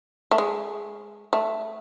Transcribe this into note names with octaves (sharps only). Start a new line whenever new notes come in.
A3
G#3
A3